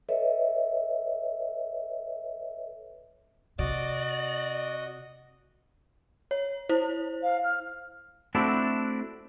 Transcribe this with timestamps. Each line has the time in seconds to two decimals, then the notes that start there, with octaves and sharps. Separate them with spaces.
0.09 A4 B4 C#5 D#5 E5
3.59 C3 F#4 D5 D#5
6.31 C#5
6.69 E4 C5
7.23 F5
7.44 F6
8.35 A3 C4 D4 E4 F#4 A4